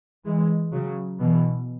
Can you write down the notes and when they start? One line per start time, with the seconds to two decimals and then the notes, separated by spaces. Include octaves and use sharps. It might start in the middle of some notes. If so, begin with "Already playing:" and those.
0.25 E3 G#3
0.72 C#3 F#3
1.20 B2 E3